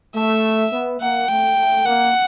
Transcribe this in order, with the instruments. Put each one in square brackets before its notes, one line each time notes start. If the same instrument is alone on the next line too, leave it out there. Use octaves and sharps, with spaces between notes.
[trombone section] A3 [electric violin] E5
[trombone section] B3
[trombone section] A#3 [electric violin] F#5
[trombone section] A3 [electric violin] G5
[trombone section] A3
[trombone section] A#3 [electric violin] F#5